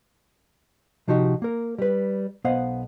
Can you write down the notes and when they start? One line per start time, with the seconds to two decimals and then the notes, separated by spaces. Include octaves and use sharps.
1.08 C3 F3 D#4 F#4 G4
1.42 A#3 A#4
1.78 G3 B4
2.44 B1 B3 C5 D#5 F5 F#5